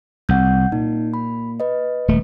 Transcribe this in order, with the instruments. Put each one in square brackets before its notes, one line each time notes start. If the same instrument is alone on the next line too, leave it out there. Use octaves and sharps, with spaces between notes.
[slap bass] C2 [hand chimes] F#5 G6
[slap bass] A#2 [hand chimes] D#4
[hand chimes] B5
B4 D#5
[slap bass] D#1 A3